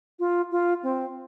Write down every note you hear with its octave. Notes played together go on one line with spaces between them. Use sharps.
F4
F4
C4